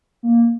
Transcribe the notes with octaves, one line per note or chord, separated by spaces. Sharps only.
A#3